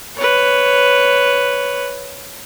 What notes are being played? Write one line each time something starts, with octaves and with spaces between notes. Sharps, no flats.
B4 C#5